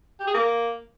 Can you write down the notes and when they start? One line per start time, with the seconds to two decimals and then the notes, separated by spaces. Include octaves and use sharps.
0.20 G4
0.27 G#4
0.34 A#3